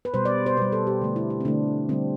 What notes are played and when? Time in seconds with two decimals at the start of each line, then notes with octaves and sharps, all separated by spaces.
0.05 B4
0.14 B2 G3 C5
0.25 D5
0.46 C5
0.57 B2 G3 B4
0.72 A4
0.87 G4
1.01 D3 A3
1.16 E4
1.30 E4
1.40 C4
1.45 D3 A3 D4
1.89 D3 G3 C4